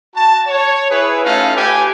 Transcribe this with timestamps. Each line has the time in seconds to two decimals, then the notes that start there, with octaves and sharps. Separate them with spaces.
0.15 F#4 A5
0.47 C#5
0.90 E4 G#4 B4
1.25 A3 C#4 D#4 F4 E5 F5
1.56 G4 B4 G#5